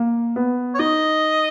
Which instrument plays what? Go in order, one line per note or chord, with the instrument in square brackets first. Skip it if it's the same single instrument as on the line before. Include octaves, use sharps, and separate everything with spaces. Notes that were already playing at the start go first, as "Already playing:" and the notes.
Already playing: [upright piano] A#3
B3
[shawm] C#5
[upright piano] D#4 [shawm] D#5